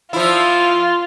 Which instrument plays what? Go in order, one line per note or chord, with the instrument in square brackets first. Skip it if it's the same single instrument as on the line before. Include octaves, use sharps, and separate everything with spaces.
[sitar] F3 E4 [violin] F4